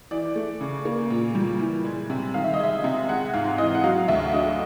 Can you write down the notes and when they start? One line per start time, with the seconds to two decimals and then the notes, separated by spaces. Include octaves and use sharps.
0.11 E3 D5
0.35 A3
0.61 C#3
0.85 A#3
1.10 A#2
1.35 G3
1.60 E3
1.85 G#3
2.10 C3
2.34 D#3 F5
2.44 E5
2.54 D#5
2.59 G#3 E5
2.84 C3
3.09 G#3 F#5
3.34 G#2 F5
3.58 E3 D#5
3.75 F#5
3.84 F#3 F5
4.08 D2 E5
4.33 D3 D#5